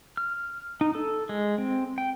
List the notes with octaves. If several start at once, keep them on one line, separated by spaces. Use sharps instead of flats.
F6
D#4
A4
G#3
C4
G5